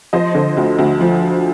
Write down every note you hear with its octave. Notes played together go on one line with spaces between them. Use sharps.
F3 C5 D#5
D3
D2
D2
F3